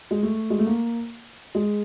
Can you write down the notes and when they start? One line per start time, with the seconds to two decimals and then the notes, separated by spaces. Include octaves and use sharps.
0.11 G#3
0.23 A3
0.50 G#3
0.59 A3
0.66 A#3
1.55 G#3